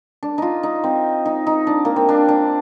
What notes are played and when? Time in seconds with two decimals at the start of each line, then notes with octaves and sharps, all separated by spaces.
0.23 D4
0.38 D#4 F4
0.63 D#4
0.84 C4
1.26 D#4
1.47 D#4
1.67 D4
1.85 A#3
1.96 C4
2.09 D4
2.28 D4